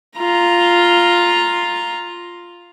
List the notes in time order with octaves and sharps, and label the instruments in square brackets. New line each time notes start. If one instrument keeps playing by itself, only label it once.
[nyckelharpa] F4 A#5